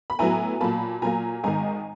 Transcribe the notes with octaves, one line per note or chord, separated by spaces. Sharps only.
B5
A2 F#3 B3 E4 G#5 A#5
A#2 F#3 A#3 A5 B5
A#2 F#3 A#3 G#5 A#5
G#1 G#2 D#3 G#5 A#5